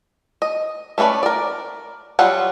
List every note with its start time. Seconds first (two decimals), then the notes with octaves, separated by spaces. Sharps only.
0.42 D#5
0.98 A3 C#4 D4 B4 D5
1.23 A#4 D5
2.19 F#3 G3 F4 F#5